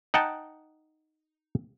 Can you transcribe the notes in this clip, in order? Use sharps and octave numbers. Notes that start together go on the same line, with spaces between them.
D#4 F#5 G5 A5